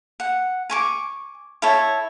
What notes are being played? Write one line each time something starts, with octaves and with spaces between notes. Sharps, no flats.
F#5
G#5 C#6 D6
E4 A4 C#5